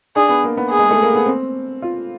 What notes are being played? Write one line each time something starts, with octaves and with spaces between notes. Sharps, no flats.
D4 G#4
B3
A#3
B3
G#4
G#3
A3
A#3
B3
C4
F4